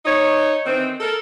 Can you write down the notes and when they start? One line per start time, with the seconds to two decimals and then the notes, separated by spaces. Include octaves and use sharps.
0.05 D#4 C#5
0.65 D#3 E3 C4
1.00 A4 A#4